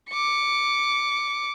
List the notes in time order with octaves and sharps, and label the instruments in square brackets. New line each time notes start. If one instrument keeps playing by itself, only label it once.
[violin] D6 C#7